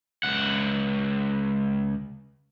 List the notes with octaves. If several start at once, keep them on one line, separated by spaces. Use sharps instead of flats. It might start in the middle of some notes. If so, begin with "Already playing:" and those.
C#2 F#5